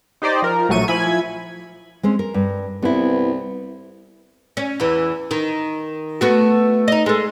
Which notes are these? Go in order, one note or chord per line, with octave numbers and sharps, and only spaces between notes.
D#4 G4 C5 D5 D#5
F3 A#4
A#1 F#3 A3 C#6 D#7
F3 E4 G#5 B5 G#6
G#3 C4 C#4
A#4
G2
C2 B3 E4
C#4
E2 E3
D#3
A3 B3 F#4
D#4 D#5
G#3 A4